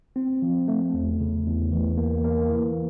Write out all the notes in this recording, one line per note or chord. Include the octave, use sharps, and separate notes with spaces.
C4
F3
A3
E2
C#3
E2
E3
A#3
A#3
E3